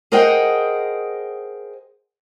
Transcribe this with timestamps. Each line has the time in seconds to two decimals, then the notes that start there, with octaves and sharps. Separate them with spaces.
0.12 G#4 A#4 C5 D#5 F#5 G5